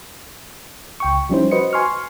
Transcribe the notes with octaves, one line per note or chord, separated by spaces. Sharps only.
C#2 G5 C#6
F3 G3 C#4 D#4 E4 C5
F#4 B4 C5 D#5 C#7
G#5 C6 C#6 F6